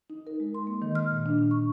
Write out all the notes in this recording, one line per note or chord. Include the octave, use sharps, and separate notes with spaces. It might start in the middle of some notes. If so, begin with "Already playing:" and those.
D#4
A#4
G#3
C6
A#3
D#3
F6
A#2
D4
D4
C#6